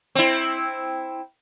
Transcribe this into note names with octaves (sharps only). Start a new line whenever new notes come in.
C4 E4